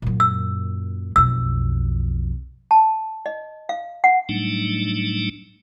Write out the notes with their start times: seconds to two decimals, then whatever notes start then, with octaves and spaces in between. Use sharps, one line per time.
0.02 F#2 A#2
0.20 E6
1.16 B1 F2 E6
2.71 A5
3.26 D#5
3.69 F5
4.04 F#5
4.29 A2 F#3 G3 A3 D4 D#4